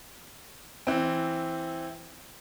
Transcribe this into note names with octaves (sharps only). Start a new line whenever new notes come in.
E3 C4